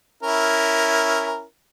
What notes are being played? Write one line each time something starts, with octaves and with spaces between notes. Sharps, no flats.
C#4 E4 A#4